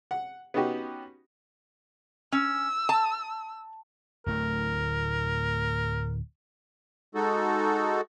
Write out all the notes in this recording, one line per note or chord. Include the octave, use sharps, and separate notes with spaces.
F#5
B3 C#4 D#4 F#4 G4
C#4 E6
A5
D1 A2 A3 A#4
G#3 D#4 F#4 A4